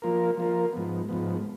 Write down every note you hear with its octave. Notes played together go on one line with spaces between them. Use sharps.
F3 A#3 F4 A#4
F3 A#3 F4 A#4
G#2 F3 B3
G#2 F3 B3